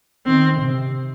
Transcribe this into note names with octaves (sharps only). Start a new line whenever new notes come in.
D#3 C4
C3